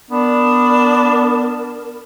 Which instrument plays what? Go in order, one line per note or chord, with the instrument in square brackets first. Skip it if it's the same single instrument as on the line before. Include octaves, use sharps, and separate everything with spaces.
[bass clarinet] B3 [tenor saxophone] D4 [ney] A#4